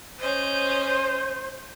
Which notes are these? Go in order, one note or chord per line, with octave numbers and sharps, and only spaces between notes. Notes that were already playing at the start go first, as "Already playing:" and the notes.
C#4 C5 D#5